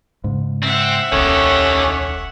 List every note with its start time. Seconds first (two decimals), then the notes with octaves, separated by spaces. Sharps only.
0.24 G#2 C#3
0.63 C4 E5 F#5
1.12 D#1 C2 D#3 C#4 G4 A4 C#5